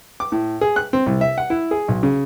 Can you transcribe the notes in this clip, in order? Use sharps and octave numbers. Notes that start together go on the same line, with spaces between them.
D6
A2
G#4
F#6
C4
C2
E5
F#5
E4
G#4
B1
C#3